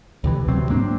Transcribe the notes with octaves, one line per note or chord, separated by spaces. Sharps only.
D2 C3 E3
D#1 C3 F#3 C4
G#2 A#3 C4 D4